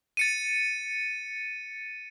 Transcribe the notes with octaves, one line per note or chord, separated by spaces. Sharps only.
A6 C#7 D#7